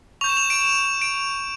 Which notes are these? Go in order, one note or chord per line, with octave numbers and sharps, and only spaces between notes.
C#6 G6 F7
E7
F7
D7
E7
D7